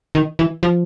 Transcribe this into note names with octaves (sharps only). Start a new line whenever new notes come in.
D#3
E3
F3